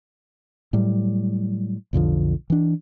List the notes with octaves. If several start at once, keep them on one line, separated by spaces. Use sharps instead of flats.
A2 F#3 G3
B1 F2 D3 F3
E3 D4